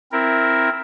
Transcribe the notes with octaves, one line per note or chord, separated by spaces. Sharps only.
C4 E4 A#4